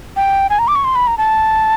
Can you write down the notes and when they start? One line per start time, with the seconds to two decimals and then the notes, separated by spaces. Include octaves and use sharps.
0.16 G5
0.50 G#5
0.59 A#5
0.68 D6
0.75 C#6
0.84 C6
0.95 B5
1.07 A#5
1.18 A5